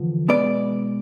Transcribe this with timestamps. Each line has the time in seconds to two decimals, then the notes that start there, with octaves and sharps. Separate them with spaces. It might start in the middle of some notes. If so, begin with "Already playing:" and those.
Already playing: E2 D3 F3
0.28 B2 G#3 B3 D5